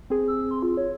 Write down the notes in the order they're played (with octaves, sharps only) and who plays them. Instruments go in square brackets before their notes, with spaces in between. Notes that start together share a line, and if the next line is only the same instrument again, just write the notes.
[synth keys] C4 G#4
[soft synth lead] E6
C6
F4
C#5